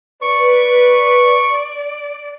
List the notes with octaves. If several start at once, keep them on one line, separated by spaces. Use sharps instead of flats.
B4 D5 C#6